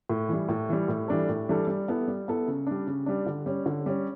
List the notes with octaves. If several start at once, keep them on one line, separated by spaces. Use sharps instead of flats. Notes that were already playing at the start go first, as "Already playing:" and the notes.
A2
E3 G3
A2
E3 G3
A2
E3 G3 D4 A4
A2
E3 G3 D4 A4
G3
B3 E4 A4
G3
B3 E4 A4
C#3
G3 D4
C#3
G3 D4
D3
G3 C#4
D3
G3 C#4